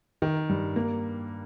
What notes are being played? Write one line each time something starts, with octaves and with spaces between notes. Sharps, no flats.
D#3
G2
A#3